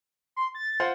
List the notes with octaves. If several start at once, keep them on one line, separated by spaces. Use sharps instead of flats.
C6
A6
F4 C5 F#5